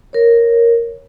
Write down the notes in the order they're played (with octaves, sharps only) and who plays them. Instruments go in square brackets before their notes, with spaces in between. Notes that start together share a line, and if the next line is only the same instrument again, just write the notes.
[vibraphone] A#4 C#5